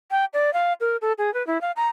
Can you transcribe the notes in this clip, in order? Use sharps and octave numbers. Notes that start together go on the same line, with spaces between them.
G5
D5
F5
A#4
A4
G#4
B4
E4
F5
A#5